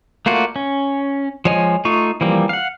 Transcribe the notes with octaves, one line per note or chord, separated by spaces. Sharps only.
A3 A#3 F4 F#4 D5
C#4
F3 G#3 C#5 D#5 G#5
A3 D#4 F4 C#6
E3 F3 G3 A#3 C4
F5 F#5